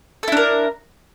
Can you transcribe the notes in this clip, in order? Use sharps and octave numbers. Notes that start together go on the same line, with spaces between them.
D4 E4 A4 A#4